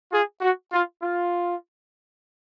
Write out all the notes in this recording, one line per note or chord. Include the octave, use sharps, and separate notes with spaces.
F4 G#4
F#4
F4
F4